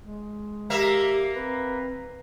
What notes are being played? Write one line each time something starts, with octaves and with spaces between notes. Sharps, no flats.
G#3
A#3 G4 A#4 E5
C4 B4